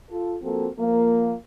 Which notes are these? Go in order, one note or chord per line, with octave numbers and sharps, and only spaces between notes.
F4 A4
F3 A#3 C4 F#4 A4
F3 A#3